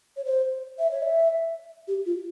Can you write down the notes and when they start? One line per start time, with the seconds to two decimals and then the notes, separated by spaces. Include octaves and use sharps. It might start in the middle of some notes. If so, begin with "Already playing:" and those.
0.16 C#5
0.24 C5
0.79 E5
0.91 C#5
1.02 E5
1.87 G4
2.06 F4